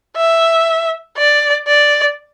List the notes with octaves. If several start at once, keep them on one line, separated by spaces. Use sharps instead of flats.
E5
D5
D5